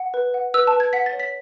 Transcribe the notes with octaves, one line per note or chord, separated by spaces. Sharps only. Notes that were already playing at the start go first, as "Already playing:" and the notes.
Already playing: F#5
B4
F#5
B4 E6
A5
B4
G#6
F#5 B6
A6
C#5
B6